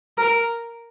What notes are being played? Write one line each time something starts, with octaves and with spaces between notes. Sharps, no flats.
A#4